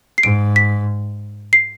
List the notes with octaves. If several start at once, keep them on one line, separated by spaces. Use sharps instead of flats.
C7
G#2 D7
B6
C7